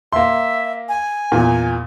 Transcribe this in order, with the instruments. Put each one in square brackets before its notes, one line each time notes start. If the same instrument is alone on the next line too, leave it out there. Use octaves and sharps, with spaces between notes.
[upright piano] A#3 C6 [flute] E5
[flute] G#5
[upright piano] E2 A#2